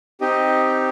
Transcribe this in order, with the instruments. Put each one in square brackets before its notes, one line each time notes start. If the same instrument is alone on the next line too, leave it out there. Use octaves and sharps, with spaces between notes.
[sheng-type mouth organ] C4 D#4 G4 D#5